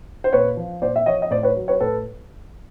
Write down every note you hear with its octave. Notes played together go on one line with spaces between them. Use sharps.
C5
A#2 B4 C#5
F3
A#2 C5 D5
E5
F3 C#5 D#5
D#5
A2 C5 D5
B4 C#5
F#3
B4 C#5
A2 A4 B4